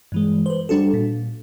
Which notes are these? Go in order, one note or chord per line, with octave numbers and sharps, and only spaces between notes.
G2 E3 G#3
B4 C5
G3 D4 F#4 A4
A#2